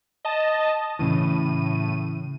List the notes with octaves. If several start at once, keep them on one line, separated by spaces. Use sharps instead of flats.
D#5 A5
A2 C#3 E3 D#7